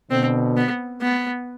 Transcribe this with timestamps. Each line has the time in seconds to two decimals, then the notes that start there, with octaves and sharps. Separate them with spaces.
0.11 B2 D3 C4
0.57 B3
1.02 B3